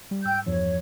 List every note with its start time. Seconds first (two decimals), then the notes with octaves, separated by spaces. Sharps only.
0.11 G3
0.25 G#2 G5 E6 G6
0.46 E2 G2 F3 C#5